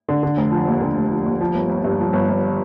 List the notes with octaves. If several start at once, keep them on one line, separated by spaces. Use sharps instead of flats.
D3
D3
F1
F3
D#2
D3
F1
F3
D#2
F3
G1
G1
G2
F3
G1
G1